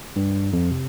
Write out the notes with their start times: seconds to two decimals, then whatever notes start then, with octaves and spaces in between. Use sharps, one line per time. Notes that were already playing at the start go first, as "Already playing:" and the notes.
0.16 G2
0.53 F2
0.71 C3